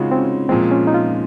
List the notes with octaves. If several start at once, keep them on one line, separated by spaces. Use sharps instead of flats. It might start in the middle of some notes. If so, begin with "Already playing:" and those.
Already playing: C#3 G#3 C4 D#4 F4 F#4
C4
C#4
A#2 F3 G#3 C4
C#4
D#4
F4